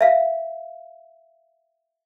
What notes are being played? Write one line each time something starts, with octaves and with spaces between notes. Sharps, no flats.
E5 F5